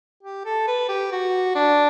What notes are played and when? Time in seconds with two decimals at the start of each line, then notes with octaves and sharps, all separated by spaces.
0.23 G4
0.45 A4
0.67 B4
0.89 G4
1.12 F#4
1.55 D4